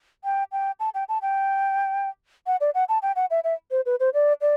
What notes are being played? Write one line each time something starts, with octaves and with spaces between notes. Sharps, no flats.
G5
G5
A5
G5
A5
G5
F#5
D5
F#5
A5
G5
F#5
E5
E5
C5
B4
C5
D5
D5